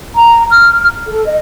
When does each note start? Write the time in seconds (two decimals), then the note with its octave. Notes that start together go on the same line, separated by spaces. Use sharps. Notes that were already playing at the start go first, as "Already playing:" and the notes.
0.15 A#5
0.51 F6
1.07 A4
1.26 D#5